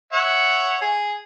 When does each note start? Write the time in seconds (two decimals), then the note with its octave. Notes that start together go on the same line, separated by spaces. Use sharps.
0.13 C#5 E5 F#5
0.81 G#4